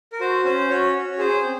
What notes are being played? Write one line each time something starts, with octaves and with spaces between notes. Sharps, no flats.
A#4
F#4 C5
C#4 C5
C#4 F#4 C#5
F#4
G#4 C5
C4